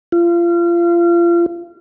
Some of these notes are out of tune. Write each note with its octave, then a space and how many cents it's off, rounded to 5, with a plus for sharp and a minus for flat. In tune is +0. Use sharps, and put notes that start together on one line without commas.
F4 -30